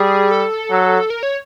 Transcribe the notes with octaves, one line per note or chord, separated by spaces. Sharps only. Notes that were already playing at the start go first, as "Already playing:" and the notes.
Already playing: G3 G#4
A4
F#3
A#4
C#5